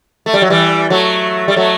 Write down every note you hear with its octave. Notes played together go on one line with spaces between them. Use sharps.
A3
G3
F#3
E3 G3
F#3 A3
G3
F#3 A3